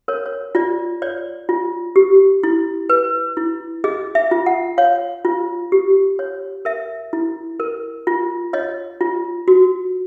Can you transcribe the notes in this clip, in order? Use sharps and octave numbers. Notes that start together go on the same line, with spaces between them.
A#4 C#5
C#5
F4 D5
C#5 D5
F4
G4
E4
B4
E4
G#4 D#5
E5
F4
F#5
C#5 F5
F4
G4
C#5
A#4 E5
E4
A#4
F4
C#5 D#5
F4
F#4